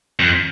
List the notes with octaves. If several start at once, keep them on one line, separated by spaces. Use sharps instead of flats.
F2